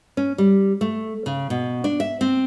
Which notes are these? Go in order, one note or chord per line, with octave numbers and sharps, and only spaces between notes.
C#4
G3
A3
C#3
B2
D4
E5
C4